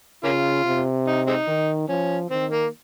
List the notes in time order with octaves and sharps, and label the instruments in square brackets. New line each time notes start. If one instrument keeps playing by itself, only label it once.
[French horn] C#3 [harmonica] A#3 C#4 F4
[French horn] C3
[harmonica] D#4
G#3 C4 D#4
[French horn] D#3
[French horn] F3 [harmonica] C#4
[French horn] D#3 [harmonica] C4
[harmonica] A#3